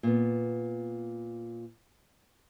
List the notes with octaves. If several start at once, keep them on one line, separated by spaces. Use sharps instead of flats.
A#2 B3